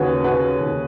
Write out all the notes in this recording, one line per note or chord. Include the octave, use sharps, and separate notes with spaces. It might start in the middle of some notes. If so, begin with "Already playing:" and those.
Already playing: D#2 C#3 F#4 G#4 B4 C#5
C#3 F#4 B4
D#2